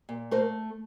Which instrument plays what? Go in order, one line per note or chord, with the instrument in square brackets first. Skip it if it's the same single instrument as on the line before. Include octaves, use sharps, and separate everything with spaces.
[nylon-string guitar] A#2
A3 A#4 C5